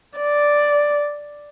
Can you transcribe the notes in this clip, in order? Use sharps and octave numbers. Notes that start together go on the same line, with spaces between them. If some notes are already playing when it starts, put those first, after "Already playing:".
D5